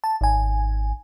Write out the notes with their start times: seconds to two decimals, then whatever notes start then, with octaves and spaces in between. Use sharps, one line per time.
0.04 A5
0.21 G#1 G#5